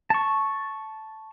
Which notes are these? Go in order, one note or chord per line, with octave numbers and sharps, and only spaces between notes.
A5 C#6